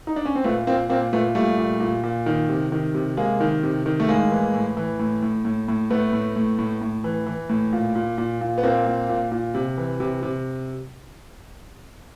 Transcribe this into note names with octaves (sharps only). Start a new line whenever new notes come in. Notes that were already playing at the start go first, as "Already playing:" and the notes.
D#4
D4
C#4
C4
A#2 A3 B3
A#2 A#3 C4
A#2 A#3 C4
A#2 A3 B3
A#2 G3 A3
A#2
A#2
A#2
D#3
C3
D#3
C3
C3 G#3 A#3
D#3
C3
D#3
A3
A2 G#3 A#3
E3
A2
E3
A2
A2
A2
A2
A2 A3 B3
A2
A2
A2
A2
E3
E3
A2
A#2
A#2
A#2
A#2
B3
A#2 A#3 C4
A#2
A#2
A#2
C3
E3
C3
C3